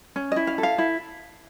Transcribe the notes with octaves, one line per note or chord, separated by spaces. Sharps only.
C#4
D#5
E4
F5
A4
F5
E4